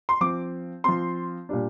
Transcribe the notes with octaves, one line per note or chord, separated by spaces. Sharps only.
C6
F3 C4 D6
F3 C4 C6
A#2 G3 D4